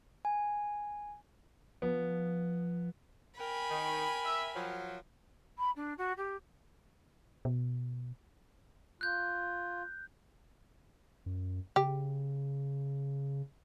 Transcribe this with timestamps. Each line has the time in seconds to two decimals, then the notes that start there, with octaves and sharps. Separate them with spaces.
0.25 G#5
1.82 F3 B3
3.39 A#4 G5 G#5 B5
3.70 D#3
4.25 E5
4.55 F3 F#3
5.58 B5
5.76 D4
5.98 F#4
6.17 G4
7.45 B2
9.01 F4 F#6 G6
11.26 F#2
11.76 C#3 G4